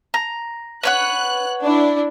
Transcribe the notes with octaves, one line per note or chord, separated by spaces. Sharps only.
A#5
B4 C#5 F#5 F#6
D4 E4